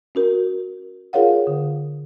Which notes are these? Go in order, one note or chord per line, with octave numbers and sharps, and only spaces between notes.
C#4 F#4 A#4
F4 G#4 A#4 C#5 F5 F#5
D3